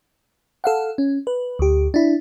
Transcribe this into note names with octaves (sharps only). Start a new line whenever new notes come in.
A4 F5 F#5
C#4
B4
D2 G4
D4 E4